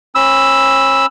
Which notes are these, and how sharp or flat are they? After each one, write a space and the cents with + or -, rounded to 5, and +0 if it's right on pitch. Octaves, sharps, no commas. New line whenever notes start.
C#4 -35 B5 +0 E6 +0